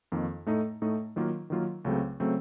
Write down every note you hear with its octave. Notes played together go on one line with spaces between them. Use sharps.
F2 D#3 A#3
A2 A3 D#4
A2 A3 D#4
D#3 F#3 A#3 F4
D#3 F#3 A#3 F4
C#2 C#3 F#3 A3 C4
C#3 F#3 A3 C4